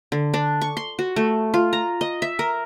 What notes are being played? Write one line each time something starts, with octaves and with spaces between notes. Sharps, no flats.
D3
D4
C#6
C6
F#4
A3
F4
A#5
D#5
E5
A#4